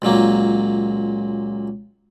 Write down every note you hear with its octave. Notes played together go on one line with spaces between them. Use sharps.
C#2 A#2 F#3 A#3